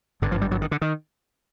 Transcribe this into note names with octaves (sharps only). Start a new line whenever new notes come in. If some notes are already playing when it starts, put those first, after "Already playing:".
G#1 G2 D3
F3
G3
F#3
D#3
D3
D#3